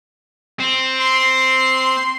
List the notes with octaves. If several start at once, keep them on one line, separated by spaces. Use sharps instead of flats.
C4
C6